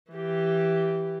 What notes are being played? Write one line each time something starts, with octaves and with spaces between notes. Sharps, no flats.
E3 G4